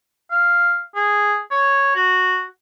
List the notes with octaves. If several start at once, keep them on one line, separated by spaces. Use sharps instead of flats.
F5
G#4
C#5
F#4